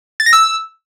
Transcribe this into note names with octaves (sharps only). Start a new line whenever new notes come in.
A6
A#6
E6